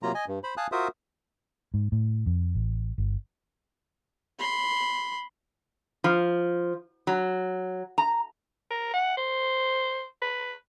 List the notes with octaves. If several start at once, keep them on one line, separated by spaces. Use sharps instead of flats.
C3 F#3 A#3 F4 A#5
D#5 G#5
G2
C5 B5
F5 G#5 A5 D#6 F#6
F4 F#4 A#4 C5 E5 D#6
G#2
A2
F2
A1
G1
B5 C6
F3
F#3
A#5
A#4
F#5
C5
B4